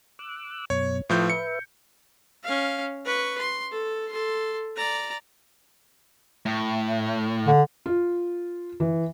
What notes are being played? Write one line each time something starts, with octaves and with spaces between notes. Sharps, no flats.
D6 E6 F#6
F#2 B2 C#5
A2 F3 B4 E5 G6
C#7
C#4 F5
B4 C#6
C6
A4
A4 C6
D5 A#5
A2
D3
F4
E3